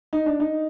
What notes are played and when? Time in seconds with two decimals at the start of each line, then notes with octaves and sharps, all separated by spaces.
0.13 D#4
0.26 D4
0.40 D#4